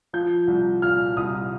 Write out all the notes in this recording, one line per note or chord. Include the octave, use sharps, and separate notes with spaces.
F3 G6
C2
A#2 F6
C2 D#6